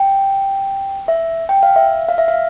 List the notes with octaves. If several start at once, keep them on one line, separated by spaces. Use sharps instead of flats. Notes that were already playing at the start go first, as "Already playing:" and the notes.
Already playing: G5
E5
G5
F5
E5
F5
E5
F5